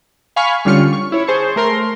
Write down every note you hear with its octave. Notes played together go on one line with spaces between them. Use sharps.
F5 G#5 B5 C#6 F6 B6
D3 G3 C#4 F4 F6 C#7
C#6
E4 C#5
G#4 C5 A5 C#6
A3 A#4 C6